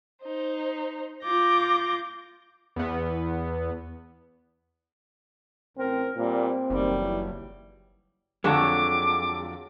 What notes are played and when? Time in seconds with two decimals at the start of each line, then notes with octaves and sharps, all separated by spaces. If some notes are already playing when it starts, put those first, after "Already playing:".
0.24 D#4 C5
1.22 F4 D6 G6 A#6
2.76 E2 B3
5.78 A1 C4 A#4
6.16 A#2 G3 C4
6.70 F#1 D#3 G3
7.00 E3
8.44 F2 D3 F#3 G#3 A4 C#5 D6